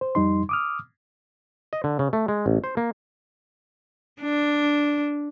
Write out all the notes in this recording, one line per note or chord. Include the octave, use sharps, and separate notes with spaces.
C5
F2 G3 D#4 C6
D6 D#6 F6
D#5
D3
C#3
A3
G#3
A1
C5
A#3
D4